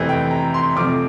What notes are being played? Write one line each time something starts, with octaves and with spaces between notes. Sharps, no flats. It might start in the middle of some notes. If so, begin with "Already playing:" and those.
Already playing: F2 C3 E3 A3 C4
G5
A#5
C6
F2 C3 F3 A3 C4 D6